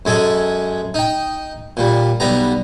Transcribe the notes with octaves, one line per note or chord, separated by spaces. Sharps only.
F#2 G#3 G#4 A4
D#4 G5
A#2 G3
B1 G3 B3 A#5